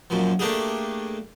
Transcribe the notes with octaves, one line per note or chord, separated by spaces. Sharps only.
F#2 A#2 F3
A3 A#3 D4 G4 G#4